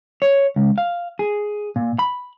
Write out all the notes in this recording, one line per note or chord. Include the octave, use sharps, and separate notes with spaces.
C#5
C#2
F5
G#4
A#2
B5